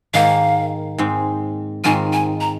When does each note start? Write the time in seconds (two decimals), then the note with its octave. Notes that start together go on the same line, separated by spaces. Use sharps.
0.14 G#2 D#3 A#3 F5
0.98 G#2 G#3 C4
1.84 G#2 D#3 C4 F4 G#5
2.13 G#5
2.41 A#5